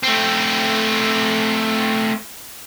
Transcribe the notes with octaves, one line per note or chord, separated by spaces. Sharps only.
A3 C4